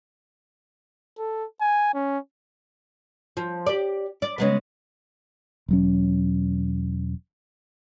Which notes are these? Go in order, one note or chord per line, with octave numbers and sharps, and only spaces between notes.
A4
G#5
C#4
F3
G4 D5
D5
C#3 G#3 B3
E1 F#3 C#4